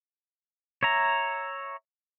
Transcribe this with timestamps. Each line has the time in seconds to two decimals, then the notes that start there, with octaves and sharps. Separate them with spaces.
0.83 C#5 E5 A#5